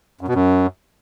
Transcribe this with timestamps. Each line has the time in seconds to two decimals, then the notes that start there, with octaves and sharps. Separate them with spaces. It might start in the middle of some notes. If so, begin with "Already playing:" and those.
0.21 F#2
0.28 B2
0.35 F#2